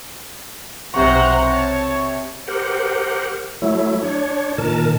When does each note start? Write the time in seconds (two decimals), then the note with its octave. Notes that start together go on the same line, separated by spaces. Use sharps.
0.94 B1 C3 F#3 C5 F#5 A#5 C#6
1.50 C#5 A5
2.48 G4 A#4 C5 F#5
3.62 F#3 A3 E4
4.02 D4 C#5
4.58 A#2 D#3 A#4 A5